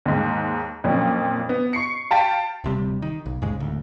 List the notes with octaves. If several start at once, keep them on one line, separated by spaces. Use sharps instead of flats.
D#2 G#2
F2 A#2 F#3 C#4 D4
B3
C#6 C7 C#7
F5 G5 A5 A6 B6 D7
D1 C3 G3
D#3
B1
D#2 G#2 C#3 G#3
D1 D2